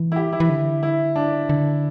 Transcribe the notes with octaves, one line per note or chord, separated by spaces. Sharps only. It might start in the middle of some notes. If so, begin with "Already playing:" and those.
Already playing: E3
E4
G4
E4
E3
D3
E4
D4
D3